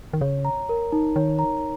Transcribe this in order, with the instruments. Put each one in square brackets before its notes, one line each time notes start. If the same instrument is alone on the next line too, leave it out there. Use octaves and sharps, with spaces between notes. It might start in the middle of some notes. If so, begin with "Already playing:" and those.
[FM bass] D#3
[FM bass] C#3 [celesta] C#5
[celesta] A#5
A#4
D#4
[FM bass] D#3 [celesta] C#5
[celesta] A#5